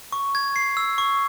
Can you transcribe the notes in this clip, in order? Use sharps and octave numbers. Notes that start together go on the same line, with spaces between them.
C#6
G#6
C7
E6
C#6